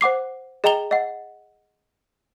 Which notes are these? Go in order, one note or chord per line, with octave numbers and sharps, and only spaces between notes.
C5 F#5 D6 C7
G#4 D#5 G5 A#5 F7 G7
D#5 F#5